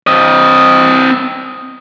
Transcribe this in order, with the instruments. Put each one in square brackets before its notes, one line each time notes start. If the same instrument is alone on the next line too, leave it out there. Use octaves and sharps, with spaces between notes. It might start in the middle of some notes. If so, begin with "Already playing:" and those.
[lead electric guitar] C4 D#5